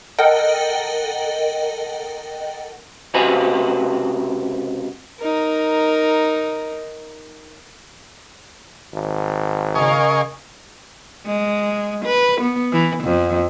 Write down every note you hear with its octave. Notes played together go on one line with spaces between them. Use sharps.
A4 A#4 D#5 F#5 G5
C#2 C3 F#4 G4 B4 G#5
D#4 A#4
G#1
C#3 A#4 D#5 F5 G#5 C#6
G#3
B4
B3
E3
F2